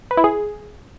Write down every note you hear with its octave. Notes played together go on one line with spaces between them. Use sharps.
B4
E4
G#4